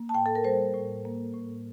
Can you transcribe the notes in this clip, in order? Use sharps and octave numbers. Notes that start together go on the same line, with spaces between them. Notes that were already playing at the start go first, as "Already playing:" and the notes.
Already playing: A#3
A5
A2 G5
A4
A#4
G3 C5
A2
A#3
A2